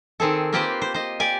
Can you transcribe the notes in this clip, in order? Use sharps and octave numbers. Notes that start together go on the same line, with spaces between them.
D#3 C4 G#4 A4
A#3 C4 F4 G4 B4 C5
C5
C5 D#5
G4 D5 G#5